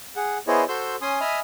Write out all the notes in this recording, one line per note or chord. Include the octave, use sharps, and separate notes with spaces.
G#4 F#5
B3 E4 G#4 C5 C#5 D#5
F#4 A4 C5 C6 E6 G6
C#4 G#5 C6 D#6
D#5 E5 G#5 B5 D#6 F6